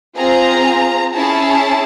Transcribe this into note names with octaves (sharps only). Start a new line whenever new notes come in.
C4 F4 G#4 A#5
C#4 E4 G#4 A5